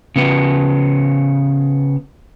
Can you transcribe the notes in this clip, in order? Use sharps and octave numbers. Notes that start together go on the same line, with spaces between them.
C#3 B3